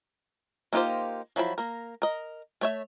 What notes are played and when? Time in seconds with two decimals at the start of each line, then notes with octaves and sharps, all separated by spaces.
0.73 A#3 D#4 F4 G4 C5
1.36 F3 F#3 E4 B5
1.58 A#3 A#4
2.02 A#4 D#5
2.61 A3 C#5 E5